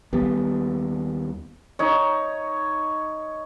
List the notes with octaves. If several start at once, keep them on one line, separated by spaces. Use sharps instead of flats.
D#2 G3 B3
D#4 C#5